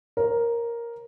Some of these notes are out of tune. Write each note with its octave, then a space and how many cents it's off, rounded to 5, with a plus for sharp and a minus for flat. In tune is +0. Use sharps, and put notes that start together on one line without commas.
A#4 +5 C#5 -45